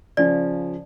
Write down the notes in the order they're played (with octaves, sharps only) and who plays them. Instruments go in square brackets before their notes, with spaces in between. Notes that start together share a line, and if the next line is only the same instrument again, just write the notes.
[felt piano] C#3 F3 C#4 [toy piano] D5